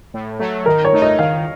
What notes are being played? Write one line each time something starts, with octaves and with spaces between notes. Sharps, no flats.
A2
F#3 A3
D#3 A#4
C#5
A3 D#4
D#5
D#3 F5